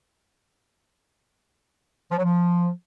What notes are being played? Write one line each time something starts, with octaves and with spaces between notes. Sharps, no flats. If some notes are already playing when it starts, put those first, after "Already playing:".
F3
F#3
F3